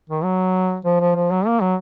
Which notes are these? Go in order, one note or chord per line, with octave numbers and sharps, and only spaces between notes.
D#3
F#3
F3
F3
F3
F#3
A#3
F#3